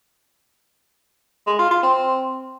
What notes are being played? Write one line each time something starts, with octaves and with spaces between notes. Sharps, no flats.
G#3
F4
F4
C4